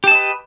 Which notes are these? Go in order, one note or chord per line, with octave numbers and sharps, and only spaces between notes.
G4 B4 D#5 A5